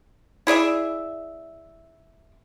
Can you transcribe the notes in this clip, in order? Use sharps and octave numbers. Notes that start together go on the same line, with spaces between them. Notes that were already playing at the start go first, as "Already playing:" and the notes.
E4 G#4 D5 E5